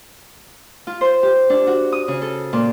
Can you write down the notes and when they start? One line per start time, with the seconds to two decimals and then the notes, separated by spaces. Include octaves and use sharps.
0.87 F4
1.01 C5
1.23 G4
1.50 D4
1.67 F#4
1.92 D#6
2.08 C#3
2.22 A4
2.53 A#2